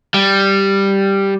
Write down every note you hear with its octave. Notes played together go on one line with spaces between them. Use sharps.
G3